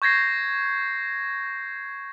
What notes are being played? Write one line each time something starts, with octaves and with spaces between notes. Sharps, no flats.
C#6 G6 G#6 A#6 C7